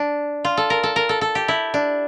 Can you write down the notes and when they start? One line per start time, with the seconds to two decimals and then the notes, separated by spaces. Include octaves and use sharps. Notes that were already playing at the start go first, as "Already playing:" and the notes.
Already playing: D4
0.45 F4
0.57 A4
0.70 A#4
0.83 A4
0.96 A#4
1.09 A4
1.21 A4
1.35 G4
1.48 E4
1.74 D4